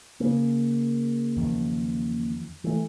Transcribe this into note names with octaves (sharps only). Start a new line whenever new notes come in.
C#3 A#3
E2 D#3 F3
E3 A3